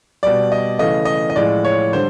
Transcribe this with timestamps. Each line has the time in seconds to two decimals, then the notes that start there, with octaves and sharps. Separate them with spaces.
0.23 B2 G3 D5
0.52 D#5
0.79 C#3 E3 A3 D#5
1.05 D#5
1.30 D#5
1.36 A2 F3 G#3 D5
1.65 C#5
1.92 D3 G3 C5